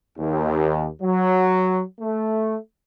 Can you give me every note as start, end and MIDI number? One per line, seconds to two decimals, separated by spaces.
0.19 0.87 39
1.01 1.82 54
2.00 2.55 57